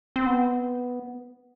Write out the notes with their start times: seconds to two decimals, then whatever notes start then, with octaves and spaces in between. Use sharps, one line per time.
0.16 C4
0.26 B3